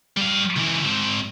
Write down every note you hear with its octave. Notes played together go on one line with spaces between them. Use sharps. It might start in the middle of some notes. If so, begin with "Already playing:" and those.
G3 F5
C#2 E3
G#2 C4